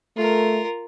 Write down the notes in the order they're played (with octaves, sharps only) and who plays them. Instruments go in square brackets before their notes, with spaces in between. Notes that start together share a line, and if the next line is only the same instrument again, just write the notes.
[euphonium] A3 [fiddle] F4 A#4